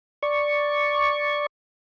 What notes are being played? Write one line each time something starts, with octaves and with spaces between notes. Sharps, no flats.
D5 C#6